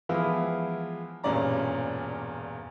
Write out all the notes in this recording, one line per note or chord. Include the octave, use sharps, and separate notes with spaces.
E3 F3 G#3 B3 E4 F4
E1 G2 A#2 C#4 D5 A#5